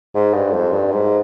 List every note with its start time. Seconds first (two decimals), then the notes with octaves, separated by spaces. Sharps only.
0.15 G#2
0.34 G2
0.53 F2
0.72 G2
0.92 G#2